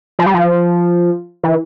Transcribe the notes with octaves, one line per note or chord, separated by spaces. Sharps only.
F3
G3
F3
E3